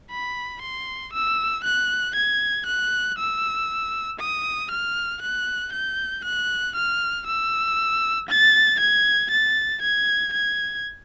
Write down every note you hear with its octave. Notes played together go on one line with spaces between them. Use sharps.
B5
C6
E6
F#6
G#6
F#6
E6
D#6
F6
F#6
G6
F#6
F6
E6
A6
G#6
A6
G#6
G#6